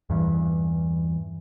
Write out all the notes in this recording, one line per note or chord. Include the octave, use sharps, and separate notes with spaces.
E2 G2 E3